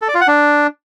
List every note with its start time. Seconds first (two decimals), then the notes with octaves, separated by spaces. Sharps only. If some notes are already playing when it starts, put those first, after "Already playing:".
0.02 A4
0.08 D5
0.15 F4
0.21 F#5
0.28 D4